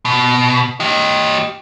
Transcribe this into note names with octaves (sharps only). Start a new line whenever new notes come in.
B2
G4 D#5